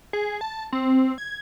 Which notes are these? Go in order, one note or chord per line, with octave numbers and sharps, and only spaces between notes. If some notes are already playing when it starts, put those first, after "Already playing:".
G#4
A5
C4
G#6